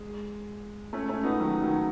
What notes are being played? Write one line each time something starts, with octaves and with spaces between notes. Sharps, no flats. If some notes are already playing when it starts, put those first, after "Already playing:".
Already playing: G#3
A3 C#4
A3 C#4
B3 D#4
D#3 F#3
D#3 F#3